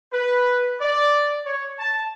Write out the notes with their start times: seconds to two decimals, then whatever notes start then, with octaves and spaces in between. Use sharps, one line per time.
0.13 B4
0.81 D5
1.45 C#5
1.79 A5